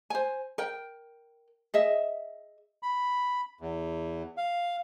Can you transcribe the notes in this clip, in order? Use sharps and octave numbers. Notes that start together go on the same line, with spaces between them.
C5 G#5
A#4 G5
G#4 D#5 E5
B5
E2
F5